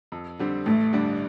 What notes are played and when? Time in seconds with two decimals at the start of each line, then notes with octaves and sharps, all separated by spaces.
0.12 F2
0.39 D3 G3 C4
0.66 A1 A3
0.93 G2 D3 G3 D4